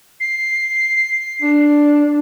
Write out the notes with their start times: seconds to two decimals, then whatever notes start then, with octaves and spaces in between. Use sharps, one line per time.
0.20 C7
1.42 D4